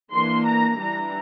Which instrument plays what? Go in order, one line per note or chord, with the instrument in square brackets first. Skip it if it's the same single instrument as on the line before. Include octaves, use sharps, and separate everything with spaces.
[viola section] E3 A#3 D4 C6
A#5
E3 G3 D4 A#5